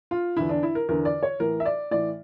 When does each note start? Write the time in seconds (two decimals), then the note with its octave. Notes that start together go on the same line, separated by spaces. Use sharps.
0.11 F4
0.37 E2 D3 E4
0.49 D4
0.63 E4
0.75 A#4
0.89 E2 D3 A#4
1.05 D5
1.23 C#5
1.40 A2 E3 A#4
1.60 E5
1.65 D5
1.91 A2 E3 D5